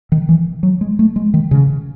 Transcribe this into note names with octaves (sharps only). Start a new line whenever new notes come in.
D#3
E3
F#3
G#3
A3
G#3
D#3
C#3